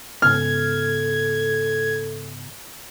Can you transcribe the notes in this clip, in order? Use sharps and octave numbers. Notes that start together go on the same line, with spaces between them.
G#2 C#3 B3 A4 F6 G#6